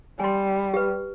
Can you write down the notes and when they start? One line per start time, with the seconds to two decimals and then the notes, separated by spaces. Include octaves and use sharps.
0.20 G3 G#5 C6
0.74 G4 B4